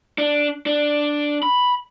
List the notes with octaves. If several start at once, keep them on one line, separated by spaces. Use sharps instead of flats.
D4
D4
B5